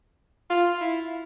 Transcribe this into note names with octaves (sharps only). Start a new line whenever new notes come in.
F4
E4